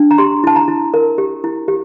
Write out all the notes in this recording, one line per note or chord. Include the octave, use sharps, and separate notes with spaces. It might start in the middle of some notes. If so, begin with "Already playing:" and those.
Already playing: D4
A#5
G4 C6
E4 A5
A#5
E4
A#4
G4
E4
G4